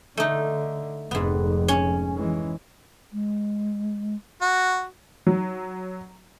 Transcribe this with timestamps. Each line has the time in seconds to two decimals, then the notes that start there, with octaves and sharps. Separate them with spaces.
0.17 D3 A3 D#4
1.11 F1 F2 G#2 B3
1.68 C#4
2.16 E3 G#3
3.12 G#3
4.42 F#4
5.27 F#3